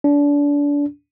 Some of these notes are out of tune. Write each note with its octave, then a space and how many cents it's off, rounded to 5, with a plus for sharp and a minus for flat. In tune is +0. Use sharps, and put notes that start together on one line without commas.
D4 -30